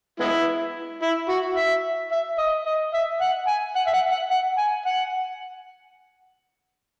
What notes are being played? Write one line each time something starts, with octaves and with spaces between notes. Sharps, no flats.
G#3 B3 E4
E4
F#4
E5
E5
D#5
D#5
E5
F#5
G#5
F#5
E5
F#5
F#5
F#5
G#5
F#5